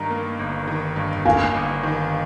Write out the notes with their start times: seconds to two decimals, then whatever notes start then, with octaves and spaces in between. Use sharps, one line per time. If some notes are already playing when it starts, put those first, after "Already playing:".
Already playing: G2 D#3 A#5
0.11 A#3
0.39 G1
0.68 D#3
0.96 G2
1.25 A#3 F5 G#5
1.54 G1
1.83 D#3